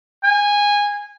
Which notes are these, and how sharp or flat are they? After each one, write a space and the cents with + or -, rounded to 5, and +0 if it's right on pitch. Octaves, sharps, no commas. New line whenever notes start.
G#5 -15